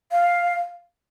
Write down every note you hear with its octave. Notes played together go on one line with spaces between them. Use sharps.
F5